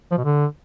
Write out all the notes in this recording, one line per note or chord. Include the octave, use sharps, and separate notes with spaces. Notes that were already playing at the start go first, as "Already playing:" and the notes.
F3
B2
D3